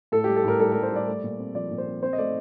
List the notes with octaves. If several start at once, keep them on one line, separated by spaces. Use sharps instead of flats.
A2 A4
G3 G4
A4
A2 A#4
G3 A4
G3 A#4
C5
G3 D5
A3
A#2
C4
F3 D5
A#2
C5
C4
C4 C5
D#5
A3 D5